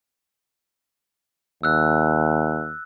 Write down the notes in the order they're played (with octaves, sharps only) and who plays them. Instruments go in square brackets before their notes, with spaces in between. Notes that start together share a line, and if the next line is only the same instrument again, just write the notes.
[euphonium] D#2 [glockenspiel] E6 F#6